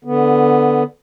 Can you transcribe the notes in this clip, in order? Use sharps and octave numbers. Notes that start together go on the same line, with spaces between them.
D3 B3